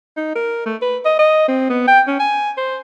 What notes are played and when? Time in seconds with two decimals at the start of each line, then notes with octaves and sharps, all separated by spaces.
0.17 D#4
0.35 A#4
0.66 A3
0.82 B4
1.05 D#5
1.19 D#5
1.48 C4
1.70 B3
1.87 G5
2.07 C#4
2.19 G#5
2.57 C5